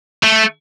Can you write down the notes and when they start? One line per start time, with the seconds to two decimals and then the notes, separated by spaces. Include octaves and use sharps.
0.23 A3